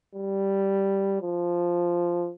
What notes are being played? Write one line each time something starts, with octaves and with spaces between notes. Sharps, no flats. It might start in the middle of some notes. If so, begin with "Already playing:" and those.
G3
F3